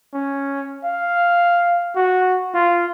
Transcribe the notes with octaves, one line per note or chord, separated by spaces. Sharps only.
C#4
F5
F#4
F4